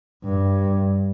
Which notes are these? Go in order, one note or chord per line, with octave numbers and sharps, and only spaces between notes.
G2